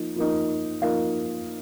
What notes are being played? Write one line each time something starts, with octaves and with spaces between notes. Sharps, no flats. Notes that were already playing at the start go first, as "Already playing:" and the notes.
Already playing: F3 A#3 D#4
F3 A#3 D#4
F3 A#3 D#4 F5